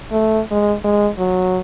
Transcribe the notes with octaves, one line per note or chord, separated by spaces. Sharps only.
A3
G#3
G#3
F#3